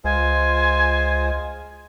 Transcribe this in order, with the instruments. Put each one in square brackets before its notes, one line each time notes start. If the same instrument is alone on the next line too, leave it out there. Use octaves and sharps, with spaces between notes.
[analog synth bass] C#2 [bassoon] G#3 [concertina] F4 C5 [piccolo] G#5